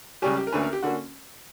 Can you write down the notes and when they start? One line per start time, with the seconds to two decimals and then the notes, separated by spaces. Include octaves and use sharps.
0.22 C#2 C#3 G3 C#4 G4
0.37 G4
0.47 A#4
0.52 D2 D3 A#3 C#4 B4
0.63 A#4
0.73 G4
0.83 D3 A#3 C#4 F#4